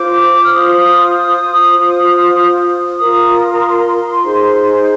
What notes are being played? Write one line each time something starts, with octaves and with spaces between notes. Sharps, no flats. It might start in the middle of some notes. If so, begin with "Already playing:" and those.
Already playing: F4 C5 D6
F6
F4 C5 D#6
F4 C5
F4 A#4 D#6
A#5
C6
D#4 G#4 C5